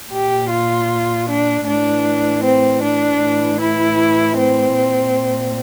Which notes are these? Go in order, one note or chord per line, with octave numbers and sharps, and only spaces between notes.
A#2 G4
F4
D4
A2 E3 D4
C4
D4
A2 E3
E4
C4
A#2